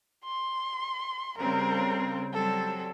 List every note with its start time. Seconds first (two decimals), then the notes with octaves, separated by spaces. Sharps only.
0.24 C6
1.38 C#3 G3 C4 A#4
2.33 F#3 G3 C4 A4